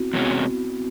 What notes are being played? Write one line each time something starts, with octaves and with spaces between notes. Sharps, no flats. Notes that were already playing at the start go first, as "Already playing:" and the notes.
Already playing: B3 C4 E4 F#4
E2 C3 E3 G#3 B3 C#4